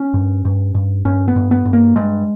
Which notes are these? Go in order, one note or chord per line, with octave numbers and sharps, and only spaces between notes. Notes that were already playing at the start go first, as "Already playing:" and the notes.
Already playing: C#4
G2
G2
G2
G2 C#4
B3
G2
B3
G2
A#3
G2 G#3